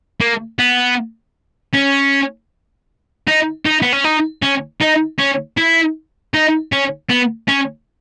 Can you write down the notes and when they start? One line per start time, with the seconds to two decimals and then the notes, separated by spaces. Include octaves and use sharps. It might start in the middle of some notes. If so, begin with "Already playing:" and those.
0.21 A#3
0.59 B3
1.74 C#4
3.27 D#4
3.66 D#4
3.82 B3
3.93 C#4
4.04 D#4
4.42 C#4
4.81 D#4
5.19 C#4
5.57 E4
6.34 D#4
6.72 C#4
7.10 B3
7.48 C#4